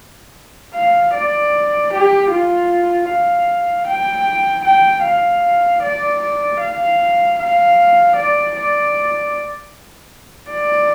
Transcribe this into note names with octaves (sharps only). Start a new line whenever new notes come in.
F5
D5
G4
F4
F5
G5
G5
F5
D5
F5
F5
D5
D5
D5